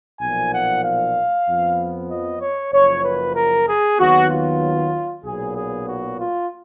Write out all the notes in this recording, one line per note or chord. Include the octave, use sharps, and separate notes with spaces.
B1 A#2 F3 G#5
F#5
F5
F2 F3 B3
D#5
C#5
F#1 F#2 F3 C#5
B4
A#4
G#4
D#2 D#3 F#3 B3 F#4
F4
B1 A#2 F#3 B3 G#4
G#4
F#4
F4